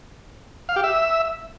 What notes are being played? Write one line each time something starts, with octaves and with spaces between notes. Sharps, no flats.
F5
G4
E5